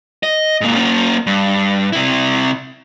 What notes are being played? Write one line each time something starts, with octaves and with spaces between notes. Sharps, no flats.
D#5
G#2 A#3
A#3 C#4
G2
C3 E4